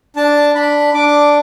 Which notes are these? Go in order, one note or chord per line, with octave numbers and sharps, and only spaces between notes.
D4 A5
D4 B5
D4 D6